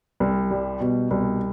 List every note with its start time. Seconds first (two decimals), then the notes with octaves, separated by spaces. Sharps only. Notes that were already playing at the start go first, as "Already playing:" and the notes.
0.20 C2
0.51 G3
0.80 B2
1.11 C2